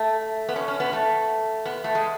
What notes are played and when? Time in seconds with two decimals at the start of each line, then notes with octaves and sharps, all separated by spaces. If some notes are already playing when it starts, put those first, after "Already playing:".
Already playing: A3
0.49 B3
0.56 C#4
0.68 C#4
0.80 B3
0.93 A3
1.66 B3
1.84 A3
1.95 G#3